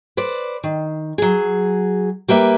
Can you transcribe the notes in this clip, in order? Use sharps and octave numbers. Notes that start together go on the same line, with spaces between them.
B4 C5 D5
D#3
F#3 G#4
G3 A#3 B4 E5